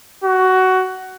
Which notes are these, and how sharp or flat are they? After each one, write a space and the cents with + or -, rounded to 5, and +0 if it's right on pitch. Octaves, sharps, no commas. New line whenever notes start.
F#4 +15